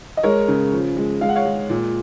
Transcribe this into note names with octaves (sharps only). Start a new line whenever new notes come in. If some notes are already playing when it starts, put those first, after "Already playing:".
D#5
G#3 A#4 C#5
C#3
F3
G#3
G#3 F5
F#5
C#5 F5
G#3
A#2